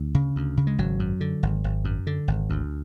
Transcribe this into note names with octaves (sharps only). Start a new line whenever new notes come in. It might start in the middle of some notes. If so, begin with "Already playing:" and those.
Already playing: D2
C#3
D2
C#3
G#3
G#1 F#3
F#2
D3
G#1
G#1
F#2
D3
G#1
D2